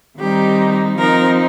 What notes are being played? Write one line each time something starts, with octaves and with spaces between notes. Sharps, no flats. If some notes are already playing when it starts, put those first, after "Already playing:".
D#3 G3 C4 D#4 G4
F3 C4 D#4 A#4